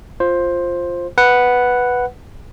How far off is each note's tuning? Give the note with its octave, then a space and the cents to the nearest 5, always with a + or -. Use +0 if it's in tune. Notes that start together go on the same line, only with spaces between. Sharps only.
F4 +0 C5 +10
B4 +0 F#5 +0